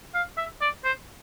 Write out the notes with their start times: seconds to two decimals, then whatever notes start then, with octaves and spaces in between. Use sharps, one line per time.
0.14 F5
0.37 E5
0.61 D5
0.84 C5